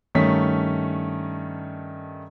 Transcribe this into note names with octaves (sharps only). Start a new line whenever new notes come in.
G2 D#3 A3 C#4 B6